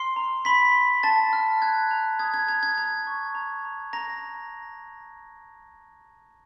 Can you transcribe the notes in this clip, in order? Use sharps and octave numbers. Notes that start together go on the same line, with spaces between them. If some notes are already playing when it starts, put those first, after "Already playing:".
Already playing: C6 F6 C7
A#5
B5 C6 B6
C6
A5 C6 A6
F6
F#6 G#6
A#5
D#6 G#6
G#6
A#5 G#6
G#6
A#5 G#6
C#6
A#5
A#5
A#5 A#6